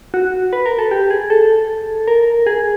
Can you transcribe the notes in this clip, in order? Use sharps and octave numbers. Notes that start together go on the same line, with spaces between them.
F#4
B4
A#4
A4
G4
G#4
A4
A#4
G#4